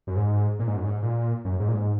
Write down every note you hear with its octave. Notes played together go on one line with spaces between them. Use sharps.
F#2
G#2
A#2
G#2
F#2
G#2
A#2
F#2
G#2
A#2
G#2